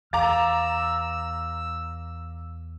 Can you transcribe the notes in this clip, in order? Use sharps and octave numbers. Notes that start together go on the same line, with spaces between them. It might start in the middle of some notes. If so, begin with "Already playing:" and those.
E2 F5 A#5 D6 E6 A6